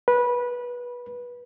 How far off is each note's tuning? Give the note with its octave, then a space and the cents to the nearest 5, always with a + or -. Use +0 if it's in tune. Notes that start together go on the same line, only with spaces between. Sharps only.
B4 -20